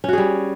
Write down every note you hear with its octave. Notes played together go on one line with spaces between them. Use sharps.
G3 C#4 F#4 G#4